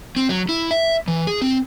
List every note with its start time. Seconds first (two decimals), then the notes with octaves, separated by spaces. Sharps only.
0.16 C4
0.29 F#3
0.49 E4
0.71 E5
1.08 E3
1.27 G#4
1.42 C4